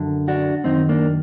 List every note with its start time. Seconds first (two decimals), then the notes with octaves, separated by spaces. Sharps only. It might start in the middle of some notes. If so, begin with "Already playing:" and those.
Already playing: F#2 D3
0.28 D4 F#4
0.64 F#2 D#3 C4 D#4
0.89 A#3 D4